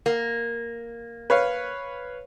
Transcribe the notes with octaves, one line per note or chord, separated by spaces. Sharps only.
A#3
B4 C#5 F5